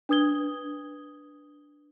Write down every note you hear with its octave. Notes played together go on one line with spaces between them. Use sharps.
D4 B4 D#6 G#6 G7